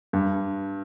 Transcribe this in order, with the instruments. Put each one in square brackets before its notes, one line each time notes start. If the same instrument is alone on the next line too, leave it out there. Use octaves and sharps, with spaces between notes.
[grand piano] G2